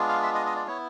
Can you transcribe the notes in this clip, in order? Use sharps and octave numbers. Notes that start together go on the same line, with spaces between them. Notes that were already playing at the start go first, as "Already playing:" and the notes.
Already playing: G#3 B3 D4 F4
F5
E5
D#5
D#5
D5
B3 E4 C#5